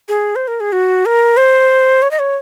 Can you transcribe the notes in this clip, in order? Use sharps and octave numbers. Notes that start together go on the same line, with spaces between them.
G#4
C5
A#4
G#4
F#4
A#4
C5
C#5
D#5
C#5